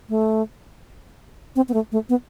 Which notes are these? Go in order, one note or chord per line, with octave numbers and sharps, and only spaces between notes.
A3
C4
B3
A3
A3
B3